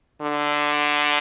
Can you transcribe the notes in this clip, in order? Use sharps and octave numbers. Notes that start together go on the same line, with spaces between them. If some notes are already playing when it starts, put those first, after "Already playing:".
D3